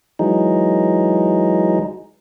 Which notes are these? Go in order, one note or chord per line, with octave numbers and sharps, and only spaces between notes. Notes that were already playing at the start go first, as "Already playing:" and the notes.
E3 F#3 G#3 D#4